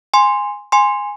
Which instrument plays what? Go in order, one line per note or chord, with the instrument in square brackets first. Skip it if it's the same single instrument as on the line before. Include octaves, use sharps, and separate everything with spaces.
[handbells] G#5 C6
G#5 C6